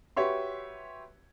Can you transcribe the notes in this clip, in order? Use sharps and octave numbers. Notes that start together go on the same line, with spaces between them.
F#4 G4 B4 C#5 E5 C6